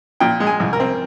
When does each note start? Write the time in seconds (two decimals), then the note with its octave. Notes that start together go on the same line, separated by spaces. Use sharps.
0.20 A#2 G5
0.40 G#3
0.47 G#5
0.60 C2
0.73 A#4
0.80 C4